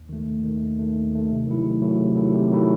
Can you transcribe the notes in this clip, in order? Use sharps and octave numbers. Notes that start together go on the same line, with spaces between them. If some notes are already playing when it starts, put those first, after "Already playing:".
Already playing: D#2
D#3 A3
D#2
D#3 A3
D#2
D#3 A3
D#2
D#3 A3
C3
D#3 F#3 A3 E4
C3
D#3 F#3 A3 E4
C3
D#3 F#3 A3 E4
C3
D#3 F#3 A3 E4